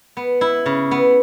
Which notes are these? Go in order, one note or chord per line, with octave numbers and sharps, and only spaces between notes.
B3
E4
C#3
B3